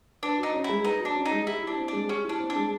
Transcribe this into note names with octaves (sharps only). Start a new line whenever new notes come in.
D4 B4
D#4 F#4
C#4
G#3 E4
D#4 B4
F#4
D4
C#4
D#4
G#3
E4 G4
D4 E4
C4
G#3 D4
C#4 G4
E4
D4
C4
D4
G#3